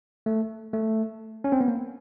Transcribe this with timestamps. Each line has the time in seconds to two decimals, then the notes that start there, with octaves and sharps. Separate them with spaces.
0.26 A3
0.73 A3
1.44 C#4
1.52 C4
1.61 B3
1.68 A#3